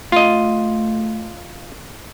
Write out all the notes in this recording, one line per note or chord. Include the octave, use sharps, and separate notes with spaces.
A3 F4 D#5